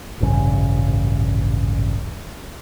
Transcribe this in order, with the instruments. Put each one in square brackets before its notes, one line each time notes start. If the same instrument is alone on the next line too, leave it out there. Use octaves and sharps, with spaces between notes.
[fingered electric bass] D#1 A1 G2 C#3